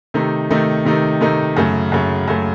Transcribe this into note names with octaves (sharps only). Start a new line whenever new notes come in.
C3 D#3 A3 D#4
C3 D#3 A3 D#4
C3 D#3 A3 D#4
C3 D#3 A3 D#4
F#2 C#3 A3
F#2 C#3 A3
F#2 C#3 A3